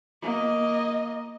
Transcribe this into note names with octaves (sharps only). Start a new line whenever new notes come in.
A#3 D#5